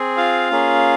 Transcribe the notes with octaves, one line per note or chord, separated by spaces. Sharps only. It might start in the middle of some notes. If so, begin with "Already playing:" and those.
Already playing: C4 G#4
F4 F5
A#3 C#4 G#4